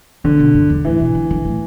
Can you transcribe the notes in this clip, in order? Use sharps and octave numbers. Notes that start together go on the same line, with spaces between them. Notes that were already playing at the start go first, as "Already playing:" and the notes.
D3 E3
B2
G2
E2
A2 E3
B2
D3
D3
A2